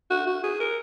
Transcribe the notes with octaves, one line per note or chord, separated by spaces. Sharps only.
F#4
F#4
G#4
A#4